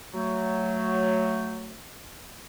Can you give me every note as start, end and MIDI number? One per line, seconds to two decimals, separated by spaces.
0.13 1.79 54
0.13 1.79 57